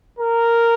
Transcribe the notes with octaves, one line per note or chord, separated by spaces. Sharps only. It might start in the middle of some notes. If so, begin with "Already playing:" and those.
A#4